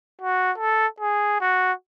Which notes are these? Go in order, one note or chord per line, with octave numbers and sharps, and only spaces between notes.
F#4
A4
G#4
F#4